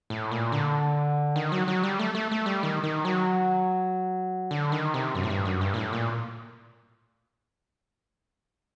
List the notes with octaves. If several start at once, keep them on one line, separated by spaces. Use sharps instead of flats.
A2
A#2
D3
D#3
F#3
F#3
G3
A3
A3
A3
G3
D#3
D#3
F#3
D3
D#3
C3
F#2
A2
G2
F#2
G2
A#2
A2
A#2